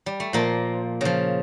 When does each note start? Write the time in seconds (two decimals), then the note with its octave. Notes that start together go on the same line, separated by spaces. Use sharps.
0.06 G3
0.20 A3
0.33 A#2 F3 A#3
1.01 C#3 F3